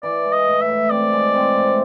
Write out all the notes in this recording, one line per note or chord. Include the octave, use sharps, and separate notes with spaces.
E3 D5
G#3
D#5
A2
E5
A2
C4 D5
G#3
C4
A2